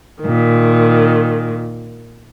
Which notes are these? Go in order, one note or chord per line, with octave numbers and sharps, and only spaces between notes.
A#2 D#3